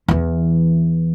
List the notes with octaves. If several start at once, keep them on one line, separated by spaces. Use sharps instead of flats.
E2 E3